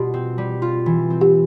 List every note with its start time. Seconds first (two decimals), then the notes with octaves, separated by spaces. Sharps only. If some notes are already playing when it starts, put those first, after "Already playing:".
Already playing: B2 G3 F4 G4
0.14 C4
0.38 G3
0.62 F4
0.86 E3
1.10 C4
1.21 G4